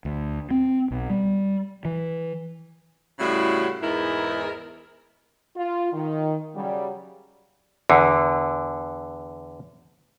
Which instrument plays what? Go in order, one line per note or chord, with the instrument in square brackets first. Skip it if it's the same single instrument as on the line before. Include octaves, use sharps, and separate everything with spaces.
[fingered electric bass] D2
C4
B1
G3
E3
[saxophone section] A2 C#3 G3 E4 F#4
E2 G#2 D#4 E4 A#4
[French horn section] F4
D#3
C#3 F#3 G3
[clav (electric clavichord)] E2 D3